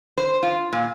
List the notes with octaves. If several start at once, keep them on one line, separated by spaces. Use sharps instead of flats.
C5
F4
A#2